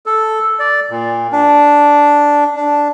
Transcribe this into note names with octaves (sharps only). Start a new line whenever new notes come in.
A4
D5
A#2
D4
D4